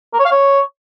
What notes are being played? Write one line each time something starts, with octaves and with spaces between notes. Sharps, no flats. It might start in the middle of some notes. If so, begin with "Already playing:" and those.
A#4
C#5
F5
C#5